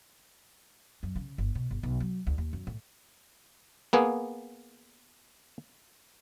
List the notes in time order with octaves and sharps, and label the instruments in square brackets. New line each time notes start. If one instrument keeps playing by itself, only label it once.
[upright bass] F#2
C#3
G1
B2
G1
B1
F#3
D2
D#2
F#2
A2
[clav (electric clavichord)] A#3 B3 G#4